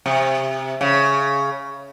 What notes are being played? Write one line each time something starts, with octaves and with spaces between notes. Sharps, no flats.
C3
C#3